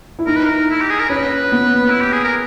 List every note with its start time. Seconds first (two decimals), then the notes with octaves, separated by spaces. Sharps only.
0.19 E4
0.27 D#4 A#4
0.36 B4
0.45 A#4
0.71 E4
0.81 G4
0.90 G#4
1.00 A#4
1.10 C#4 B4
1.52 B3
1.90 E4
2.01 G4
2.12 G#4
2.24 A#4